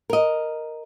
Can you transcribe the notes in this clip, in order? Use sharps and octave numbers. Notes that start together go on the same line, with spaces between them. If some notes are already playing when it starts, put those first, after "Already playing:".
A#4 D#5